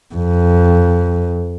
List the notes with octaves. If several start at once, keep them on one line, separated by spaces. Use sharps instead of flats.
F2